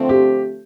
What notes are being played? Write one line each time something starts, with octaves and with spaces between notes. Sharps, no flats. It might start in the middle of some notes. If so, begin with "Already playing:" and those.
Already playing: D3 F3 A3 C4
G4